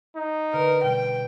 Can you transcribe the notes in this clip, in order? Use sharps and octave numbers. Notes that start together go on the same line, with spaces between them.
D#4
D3 A#4 B4
B2 G3 G5